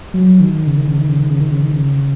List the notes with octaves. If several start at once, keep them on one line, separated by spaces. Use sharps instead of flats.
F#3
D#3
C#3
D#3
C#3
D#3
C#3
D#3
C#3
D#3
C#3
D#3
C#3